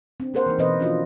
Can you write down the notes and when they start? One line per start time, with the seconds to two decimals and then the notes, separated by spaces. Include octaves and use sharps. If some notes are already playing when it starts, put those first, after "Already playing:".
0.20 C4 D4
0.34 A#3 G#4 A#4 C5 F#5
0.46 E3 A#3 D#4
0.59 B2 E3 C4 B4 C5 D#5
0.80 F3 C#4 D4 F4 F#4 D#5